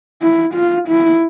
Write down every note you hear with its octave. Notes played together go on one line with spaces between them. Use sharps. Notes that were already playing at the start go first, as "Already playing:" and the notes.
E4
F4
E4